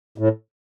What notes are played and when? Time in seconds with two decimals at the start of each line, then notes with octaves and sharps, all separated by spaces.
0.18 A2